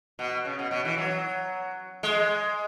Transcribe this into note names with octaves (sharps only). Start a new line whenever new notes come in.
B2
C#3
B2
B2
E3
F#3
G#3